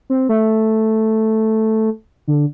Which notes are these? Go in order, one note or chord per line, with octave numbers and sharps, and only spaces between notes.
C4
A3
D3